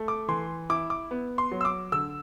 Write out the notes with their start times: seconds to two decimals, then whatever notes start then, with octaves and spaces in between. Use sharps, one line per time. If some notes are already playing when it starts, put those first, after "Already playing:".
Already playing: A3
0.08 D6
0.28 E3 C6
0.70 E4 D6
0.90 D6
1.11 B3
1.38 C6
1.51 F#3
1.61 E6
1.65 D6
1.92 D3 E6